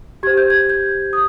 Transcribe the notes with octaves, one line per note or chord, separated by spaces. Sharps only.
G4 C5 G#6
G6
G#6
G6
D#6